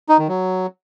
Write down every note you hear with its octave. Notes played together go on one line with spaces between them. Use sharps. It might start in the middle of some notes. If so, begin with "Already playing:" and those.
D#4
D#3
F#3